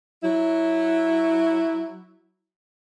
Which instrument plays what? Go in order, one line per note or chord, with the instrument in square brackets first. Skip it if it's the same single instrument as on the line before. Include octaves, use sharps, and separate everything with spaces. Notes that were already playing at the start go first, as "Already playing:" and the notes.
[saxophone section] F#3 E4